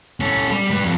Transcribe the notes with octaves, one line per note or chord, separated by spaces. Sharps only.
C#4 A4
G3
G3 B4
F2